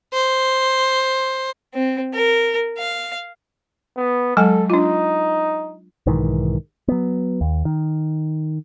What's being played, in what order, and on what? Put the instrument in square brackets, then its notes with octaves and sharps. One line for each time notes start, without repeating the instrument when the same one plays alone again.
[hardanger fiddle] C5
[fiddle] C4
A#4
F5
[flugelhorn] B3
[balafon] F#3 G#3 G#5 [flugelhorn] A4
[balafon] D4 F4 [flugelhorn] D#4
[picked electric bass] B1 G#2 D#3 E3
F#3 B3
D#2
D#3